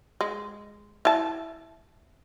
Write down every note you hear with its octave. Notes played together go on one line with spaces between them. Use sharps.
G#3
E4 A5